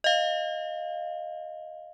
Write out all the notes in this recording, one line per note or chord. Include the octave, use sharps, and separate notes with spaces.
D#5 F5